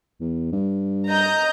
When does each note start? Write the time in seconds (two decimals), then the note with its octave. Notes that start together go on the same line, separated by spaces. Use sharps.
0.20 E2
0.52 G2
1.09 D#5 A#5 G6